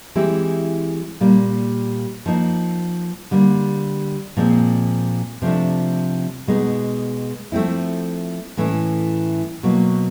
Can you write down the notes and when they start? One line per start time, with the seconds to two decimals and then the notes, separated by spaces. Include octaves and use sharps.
0.15 E3 G#3 C4 E4 G4
1.20 A#2 G3 A#3
2.26 F3 A#3 D#4
3.31 D3 G3 A#3
4.37 A#2 F3 G#3 C4
5.42 C3 F3 A3 D4
6.47 B2 G#3 B3 D#4
7.52 F3 A3 C4 E4
8.57 A2 E3 A3 C#4
9.63 B2 F#3 A#3